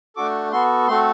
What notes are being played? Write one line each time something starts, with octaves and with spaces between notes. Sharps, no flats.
A3 D4 F#4 A4 D6
B3 F#4 A4 C6
A3 C4 F#4 A4 C6